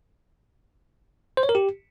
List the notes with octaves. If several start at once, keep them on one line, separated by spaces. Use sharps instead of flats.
C5
C#5
A#4
G4